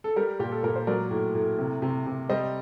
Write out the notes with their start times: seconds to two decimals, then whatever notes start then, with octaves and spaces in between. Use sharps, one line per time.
0.04 A4
0.16 G3 G4 A#4
0.39 A#2 G4
0.52 A4
0.63 A#2 A#4
0.76 C5
0.87 F#3 A#4 D5
1.11 A2
1.35 A2
1.59 C3
1.82 C3
2.06 C3
2.29 G3 C5 D#5